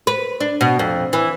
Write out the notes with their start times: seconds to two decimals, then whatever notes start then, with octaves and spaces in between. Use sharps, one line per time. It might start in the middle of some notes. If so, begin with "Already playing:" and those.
0.07 B4
0.40 D4
0.61 B2
0.79 F2
1.13 E3